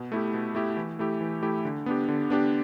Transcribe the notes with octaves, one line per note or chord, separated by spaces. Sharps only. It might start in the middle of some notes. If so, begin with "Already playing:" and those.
Already playing: B2
A3 E4 G4
B2
A3 E4 G4
E3
A3 E4 G4
E3
A3 E4 G4
D3
B3 D4 G4
D3
B3 D4 G4